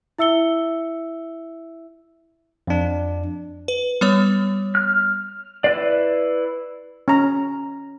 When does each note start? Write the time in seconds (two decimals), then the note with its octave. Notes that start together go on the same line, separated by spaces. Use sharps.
0.18 E4 E5 E6 C#7 G7
2.67 F2 D4
3.68 B4
4.01 G3 B3 C#5
4.75 F6
5.64 E4 B4 D5 C7
7.08 C#4 A#5